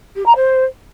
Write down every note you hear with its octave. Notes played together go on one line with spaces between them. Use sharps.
G4
A#5
C5